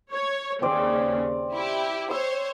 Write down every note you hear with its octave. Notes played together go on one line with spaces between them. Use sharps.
C#5
D#2 C#3 C4 D5
E4 G4
C5 C#5 E6